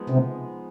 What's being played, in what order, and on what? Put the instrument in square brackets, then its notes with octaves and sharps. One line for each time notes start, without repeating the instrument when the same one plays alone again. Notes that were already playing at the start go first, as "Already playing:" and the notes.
Already playing: [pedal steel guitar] F3 G#3 B3 D#4 G#4
[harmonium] C3